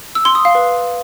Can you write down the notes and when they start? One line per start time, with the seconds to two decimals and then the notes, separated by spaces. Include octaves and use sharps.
0.15 E6
0.25 C6
0.35 D#6
0.45 F5
0.55 B4